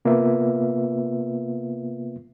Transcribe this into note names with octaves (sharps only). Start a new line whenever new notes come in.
C3 A#3 B3 F4 B4 E5